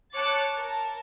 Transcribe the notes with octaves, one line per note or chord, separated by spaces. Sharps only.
C#5 A5 D6 F#6 A6 C#7
A#4 A5